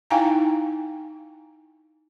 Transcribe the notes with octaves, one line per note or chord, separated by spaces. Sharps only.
D#4 E4 F5 G5 G#5 A#5